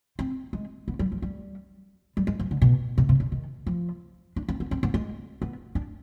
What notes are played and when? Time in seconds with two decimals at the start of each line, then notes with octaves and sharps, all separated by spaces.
0.19 C4
0.53 G#3
0.88 B3
0.99 G3
1.12 F3
1.22 G3
2.17 G3
2.27 G#3
2.39 F3
2.51 D3
2.62 B2
2.98 B2
3.09 C3
3.20 D3
3.32 D#3
3.67 F3
4.36 D4
4.49 C4
4.60 B3
4.71 C4
4.83 B3
4.94 G#3
5.42 B3
5.75 D4